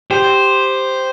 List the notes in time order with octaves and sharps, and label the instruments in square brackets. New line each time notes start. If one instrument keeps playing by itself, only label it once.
[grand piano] G4 [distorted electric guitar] C5